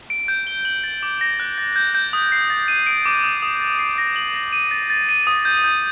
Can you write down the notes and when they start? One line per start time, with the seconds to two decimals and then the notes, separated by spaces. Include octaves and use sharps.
0.10 D7
0.28 G6
0.47 G7
0.65 F#7
0.84 A6
1.03 D6
1.21 A#6
1.40 F#6
1.58 A6
1.76 G6
1.95 G6
2.13 D#6
2.32 C7
2.50 A6
2.68 D#7
2.86 D7
3.06 D6
3.24 D#6
3.42 D#6
3.61 A6
3.79 C7
3.98 A#6
4.16 F#7
4.35 A#6
4.53 D#7
4.71 A6
4.90 A6
5.09 D#7
5.27 D#6
5.45 G6
5.64 G6